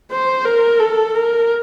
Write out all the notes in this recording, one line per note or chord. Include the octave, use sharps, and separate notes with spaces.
C5
A#4
A4
A#4